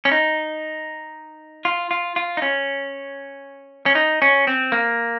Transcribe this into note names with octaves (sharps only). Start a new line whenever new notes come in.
C#4
D#4
F4
F4
F4
D#4
C#4
C#4
D#4
C#4
C4
A#3